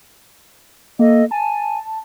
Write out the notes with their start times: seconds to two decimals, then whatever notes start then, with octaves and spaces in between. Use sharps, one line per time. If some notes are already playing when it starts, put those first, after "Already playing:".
0.99 A#3 A4 D#5
1.31 G#5 A5